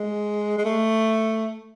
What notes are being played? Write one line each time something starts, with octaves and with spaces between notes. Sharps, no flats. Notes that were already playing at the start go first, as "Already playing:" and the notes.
Already playing: G#3
G#3
A3